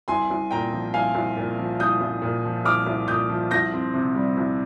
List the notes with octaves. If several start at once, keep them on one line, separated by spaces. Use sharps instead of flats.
C2 G#5 C6
C2
A#2 G5 A#5
F3
C2 F5 G#5
C2
A#2
F3
C2 D#6 G6
C2
A#2
F3
C2 D6 F6
C2
A#2 D#6 G6
F3
C2 G6 A#6
C4
C3
G3
C2